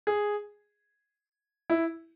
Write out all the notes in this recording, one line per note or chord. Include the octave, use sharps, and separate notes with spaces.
G#4
E4